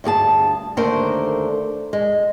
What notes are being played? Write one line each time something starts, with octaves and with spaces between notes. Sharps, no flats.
D2 G2 G#4 A5
D#2 D3 A3 A#4 C5
G#3